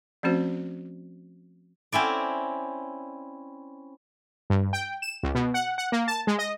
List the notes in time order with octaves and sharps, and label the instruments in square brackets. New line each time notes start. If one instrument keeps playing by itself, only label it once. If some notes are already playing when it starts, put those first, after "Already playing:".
[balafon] F3 A3 C4 C#4 F#4 C5
[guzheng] C4 C#4 E4 D5
[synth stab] G2
G5
E7
C#2
B2
F#5
F#5
A#3
A5
G#3
D#5